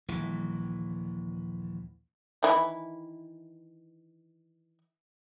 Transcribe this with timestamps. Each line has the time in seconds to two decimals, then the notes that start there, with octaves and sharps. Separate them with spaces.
0.08 D#1 A#1 E3
2.43 D#3 E3 E4